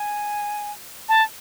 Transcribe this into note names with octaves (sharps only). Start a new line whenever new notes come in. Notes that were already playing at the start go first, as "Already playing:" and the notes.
Already playing: G#5
A5